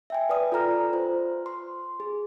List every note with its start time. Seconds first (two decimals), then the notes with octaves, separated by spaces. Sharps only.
0.10 E5 G5 G#5
0.29 B4 D5 D#6
0.52 F4 A4 A#5 F6
0.93 F4 C5
1.46 C6
2.00 G#4